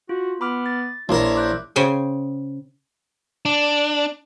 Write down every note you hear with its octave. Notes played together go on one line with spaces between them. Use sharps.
F4 F#4
B3 B5 D6 F6
A6
A#1 E4 A#4 C#5 A5 C6
D6 F#6 G6
C#3 C5 G5 G#5
D4